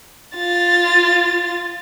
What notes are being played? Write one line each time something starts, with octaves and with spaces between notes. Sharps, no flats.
F4 A6